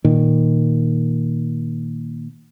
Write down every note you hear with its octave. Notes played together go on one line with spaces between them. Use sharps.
A#2 D#3